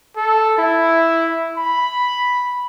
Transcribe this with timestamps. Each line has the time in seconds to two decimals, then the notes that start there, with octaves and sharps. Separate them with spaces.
0.16 A4
0.58 E4
1.56 B5